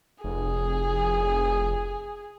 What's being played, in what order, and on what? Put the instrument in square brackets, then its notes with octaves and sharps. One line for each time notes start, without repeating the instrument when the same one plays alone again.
[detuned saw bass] F1 [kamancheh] G#4